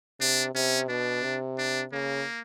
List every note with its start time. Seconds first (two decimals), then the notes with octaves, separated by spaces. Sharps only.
0.20 C3 D4
0.55 C3 C#4
0.89 B2 D4
1.23 C3
1.58 D4
1.92 C#3 A#3